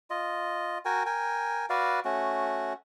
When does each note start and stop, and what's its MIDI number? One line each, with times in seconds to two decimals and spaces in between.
0.10 0.78 65
0.10 0.78 75
0.85 1.03 66
0.85 1.03 70
0.85 1.03 79
0.85 1.03 80
1.06 1.66 70
1.06 1.66 79
1.06 1.66 80
1.70 2.00 66
1.70 2.00 71
1.70 2.00 74
1.70 2.00 77
2.05 2.73 57
2.05 2.73 61
2.05 2.73 66